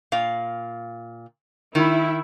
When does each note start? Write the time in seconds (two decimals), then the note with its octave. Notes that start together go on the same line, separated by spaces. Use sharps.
0.12 A#2 F5
1.75 D#3 E4